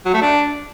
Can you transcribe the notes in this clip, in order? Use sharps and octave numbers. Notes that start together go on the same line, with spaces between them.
F#3
A3
D4